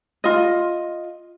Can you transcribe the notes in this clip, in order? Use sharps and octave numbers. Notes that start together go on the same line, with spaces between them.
F4 D#5